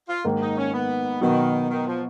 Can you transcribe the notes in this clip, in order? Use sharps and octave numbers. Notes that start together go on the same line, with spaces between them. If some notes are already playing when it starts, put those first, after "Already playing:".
F4
G#2 D#3 A#3
D#4
C#4
B3
B2 D#3 F#3 B3 F#4
D#3
F3